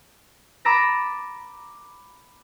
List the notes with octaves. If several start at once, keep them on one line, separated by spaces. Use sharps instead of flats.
A#5 B5 D6 E6 A6 A#6